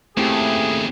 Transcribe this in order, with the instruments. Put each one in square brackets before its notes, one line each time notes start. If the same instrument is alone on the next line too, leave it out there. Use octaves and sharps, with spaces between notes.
[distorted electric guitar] D#2 C#3 [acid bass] A3 [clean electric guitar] C4 E4 G4 [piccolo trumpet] G#4